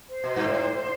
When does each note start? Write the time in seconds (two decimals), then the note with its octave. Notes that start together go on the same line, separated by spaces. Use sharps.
0.09 C5
0.24 B2
0.36 G2
0.44 A2